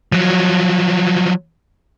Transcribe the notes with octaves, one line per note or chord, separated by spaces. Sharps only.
F3 F#3